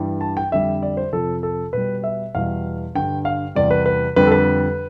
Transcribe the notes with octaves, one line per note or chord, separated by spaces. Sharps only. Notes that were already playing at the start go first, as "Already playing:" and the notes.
Already playing: G2 E3 G3
A5
G5
F2 D3 G3 E5
D5
C5
F2 C3 F3 A4
A4
B2 G3 B4
E5
E2 B2 G3 F5
G2 D3 G3 G5
F5
E2 C3 G3 D5
B4
B4
F2 D3 G3 B4
A4
B4